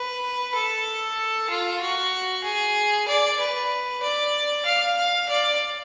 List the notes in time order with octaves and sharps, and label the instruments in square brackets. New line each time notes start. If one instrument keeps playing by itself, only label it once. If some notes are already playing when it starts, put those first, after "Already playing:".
Already playing: [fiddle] B4
A4
F4
F#4
G#4
D5
B4
D5
F5
F5
D5